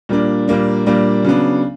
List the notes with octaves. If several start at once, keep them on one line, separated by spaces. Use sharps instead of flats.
A#2 G3 A#3 D4
A#2 G3 A#3 D4
A#2 G3 A#3 D4
C#3 F#3 B3 D4